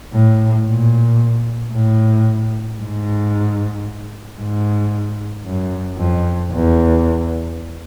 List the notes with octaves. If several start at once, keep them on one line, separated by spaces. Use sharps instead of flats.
A2
A#2
A2
G#2
G#2
F#2
F2
E2